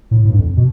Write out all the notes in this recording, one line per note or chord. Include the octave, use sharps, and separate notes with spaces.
A2
A2
G2
F2
B2